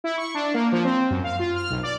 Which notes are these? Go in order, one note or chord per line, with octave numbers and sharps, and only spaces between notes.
E4
C#6
D4
A#3
F3
C4
F#2
F5
F4
F6
B1
D5